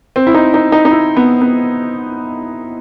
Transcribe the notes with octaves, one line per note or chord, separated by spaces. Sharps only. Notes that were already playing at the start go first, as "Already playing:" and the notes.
C4
E4
D#4
D#4
D#4
D#4
E4
B3
B3